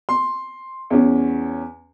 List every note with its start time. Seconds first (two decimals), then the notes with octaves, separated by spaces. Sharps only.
0.09 C6
0.90 E2 C#4